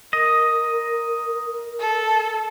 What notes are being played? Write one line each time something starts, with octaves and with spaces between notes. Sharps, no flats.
A#4 D#5
A4